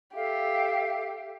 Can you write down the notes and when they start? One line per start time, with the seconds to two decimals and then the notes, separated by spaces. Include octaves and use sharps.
0.15 G4 A4 E5 F5